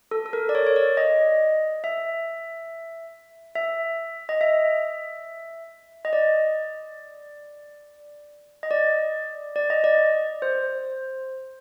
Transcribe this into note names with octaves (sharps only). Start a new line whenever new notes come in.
A4
A4
A#4
D5
C#5
C#5
D5
D#5
E5
E5
D#5
E5
D#5
D5
D#5
D5
D5
D#5
D5
C5